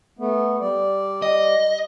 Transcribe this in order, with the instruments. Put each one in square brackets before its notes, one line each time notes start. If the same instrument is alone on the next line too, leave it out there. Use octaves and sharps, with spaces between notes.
[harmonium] A3 B3
G3 D5
[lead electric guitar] D#5